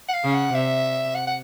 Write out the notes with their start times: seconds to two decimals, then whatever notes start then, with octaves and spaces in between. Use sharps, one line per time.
0.09 F#5
0.14 F5
0.23 C#3
0.34 F#5
0.54 C3 E5
1.15 F#5
1.27 F#5